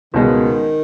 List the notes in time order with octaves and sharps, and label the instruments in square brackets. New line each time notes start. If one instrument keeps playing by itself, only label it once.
[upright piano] C#2 B2 G#3 [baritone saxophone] D#3